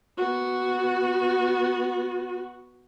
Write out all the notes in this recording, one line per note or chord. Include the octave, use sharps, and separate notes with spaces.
B3 F#4